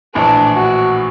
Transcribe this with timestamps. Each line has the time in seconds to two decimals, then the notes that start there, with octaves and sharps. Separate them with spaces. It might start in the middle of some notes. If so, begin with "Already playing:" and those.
0.15 A#1 A2 E3 D4
0.55 F#4